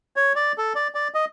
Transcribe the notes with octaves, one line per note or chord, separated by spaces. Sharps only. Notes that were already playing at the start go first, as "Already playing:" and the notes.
C#5
D5
A4
D5
D5
D#5